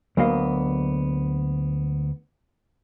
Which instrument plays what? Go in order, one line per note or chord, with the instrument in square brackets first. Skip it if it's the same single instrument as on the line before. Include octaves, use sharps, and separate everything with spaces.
[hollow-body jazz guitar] D2 F#3 A#3 B3 D#5 F5